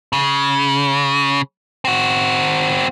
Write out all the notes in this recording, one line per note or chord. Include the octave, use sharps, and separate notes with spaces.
C#3
C4 F#4